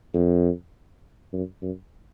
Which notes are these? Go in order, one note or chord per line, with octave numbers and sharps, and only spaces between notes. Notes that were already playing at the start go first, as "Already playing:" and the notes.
F2
F#2
F#2